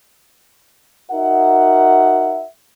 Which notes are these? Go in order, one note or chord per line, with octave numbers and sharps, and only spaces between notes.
D#4 F#4 A#4 E5 F#5